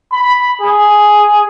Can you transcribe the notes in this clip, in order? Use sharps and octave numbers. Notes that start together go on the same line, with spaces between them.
B5
G#4